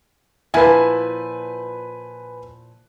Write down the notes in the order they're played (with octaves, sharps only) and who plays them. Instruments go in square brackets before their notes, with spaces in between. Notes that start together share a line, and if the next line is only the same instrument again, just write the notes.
[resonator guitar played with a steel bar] A#2 F3 E4 [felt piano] B4 G#5